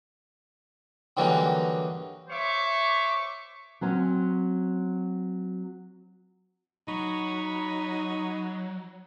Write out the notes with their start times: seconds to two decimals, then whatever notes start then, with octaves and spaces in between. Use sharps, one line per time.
1.17 D3 E3 F#3 G3 A#3 D#4
2.29 C5 C#5 E5 C#6 D6
3.81 F#3 C4 C#4
6.88 F#3 D#4 B5 C#6